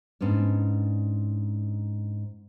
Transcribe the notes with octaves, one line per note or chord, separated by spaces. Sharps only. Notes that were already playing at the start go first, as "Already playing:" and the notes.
G#2 B3 C#4 D4